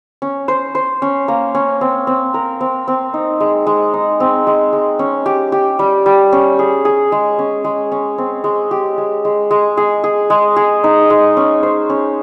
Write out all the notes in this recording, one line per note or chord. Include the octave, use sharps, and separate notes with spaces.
C#4
C5
C5
C#4
A#3
C#4
C4
C4
A#4
C4
C4
D#4
G#3
G#3
D#4
C4
G#3
G#3
C#4
G4
G4
G3
G3
C#4
G#4
G#4
G#3
C#4
G#3
C#4
C4
G#3
G4
G#3
G#3
G#3
G#4
G#4
G#3
G#4
D#4
G#3
C#4
C5
C#4